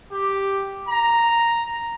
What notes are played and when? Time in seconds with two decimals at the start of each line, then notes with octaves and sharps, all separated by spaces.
0.12 G4
0.89 A#5